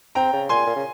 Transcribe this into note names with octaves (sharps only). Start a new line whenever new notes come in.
C4 G5 A#5
C#3
A#2 G#5 C6
A#2
C#3